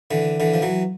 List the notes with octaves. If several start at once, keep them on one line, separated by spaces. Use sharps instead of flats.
D3 E3
D3 E3
F3
E3 F#3